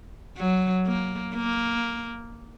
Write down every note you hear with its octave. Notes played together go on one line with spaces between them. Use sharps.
F#3
A#3
A#3